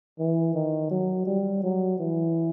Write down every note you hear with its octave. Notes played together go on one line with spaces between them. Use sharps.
E3
D#3
F#3
G3
F#3
E3